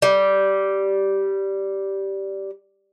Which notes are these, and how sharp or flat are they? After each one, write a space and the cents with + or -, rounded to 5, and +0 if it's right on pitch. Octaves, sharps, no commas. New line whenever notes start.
G3 -10